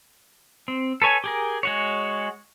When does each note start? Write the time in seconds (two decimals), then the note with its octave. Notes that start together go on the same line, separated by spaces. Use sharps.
0.68 C4
1.02 A4 B4 C#5 G#5
1.24 G4 G#4 A#4
1.63 G#3 F#4 C#5